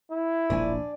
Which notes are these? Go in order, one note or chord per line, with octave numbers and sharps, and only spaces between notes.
E4
E1 A#1 D4 G#5